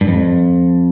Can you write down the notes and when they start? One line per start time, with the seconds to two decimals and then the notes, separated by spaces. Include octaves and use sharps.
0.01 G2
0.08 F2